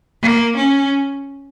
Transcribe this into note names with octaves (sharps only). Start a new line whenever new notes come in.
A#3
C#4